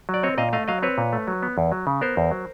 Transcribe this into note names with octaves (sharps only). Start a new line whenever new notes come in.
F#3
D5
C4 C#5 D#5
A#2 D#5 F5
A3 D#5 F5
F#3 D#5 F5
C4 B4 C#5
A#2
A3
F#3
B3
E2
F#3
C#3
B3 A#4 C5
E2
F#3